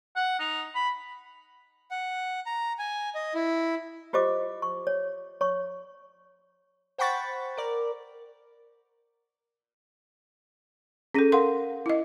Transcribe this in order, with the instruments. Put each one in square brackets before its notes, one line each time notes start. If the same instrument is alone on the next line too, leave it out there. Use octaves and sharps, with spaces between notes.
[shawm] F#5
D#4
B5
[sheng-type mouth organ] F#5
A#5
G#5
D#5
E4
[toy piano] F4 G4 C5 D#5 D6
C#6
C#5
C#5 C#6
[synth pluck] C5 F#5 G5 B5 C#6 A6
A#4 D5
[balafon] C#4 A4 [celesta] G#4 A#6 D#7
[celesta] A#4 F5 F#5 [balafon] C6
[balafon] E4 D#5